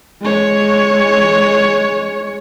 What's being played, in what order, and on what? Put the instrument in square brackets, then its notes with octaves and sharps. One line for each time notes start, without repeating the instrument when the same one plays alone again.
[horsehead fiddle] G#3 C#5